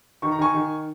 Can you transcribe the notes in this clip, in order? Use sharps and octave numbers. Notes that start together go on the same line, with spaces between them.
D#3 C#6
A#5
D#3 G#5 C#6
D#3